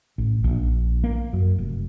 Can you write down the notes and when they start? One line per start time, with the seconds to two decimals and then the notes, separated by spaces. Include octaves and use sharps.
0.18 A1
0.44 A#1
1.04 A#3
1.33 F#2
1.58 F1